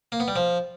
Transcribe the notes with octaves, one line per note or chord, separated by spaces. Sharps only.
A#3
B3
G3
F3